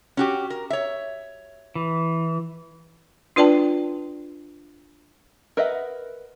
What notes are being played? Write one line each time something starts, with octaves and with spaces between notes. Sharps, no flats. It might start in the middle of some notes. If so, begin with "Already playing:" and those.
C#4 F#4 G4
A#4
C#5 E5
E3
D4 F4 B4 D5 G5 A5
A#4 B4 D#5 E5 F#5